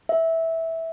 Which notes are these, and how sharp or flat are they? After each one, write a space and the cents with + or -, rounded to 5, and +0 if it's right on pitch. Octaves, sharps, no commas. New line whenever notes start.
E5 -10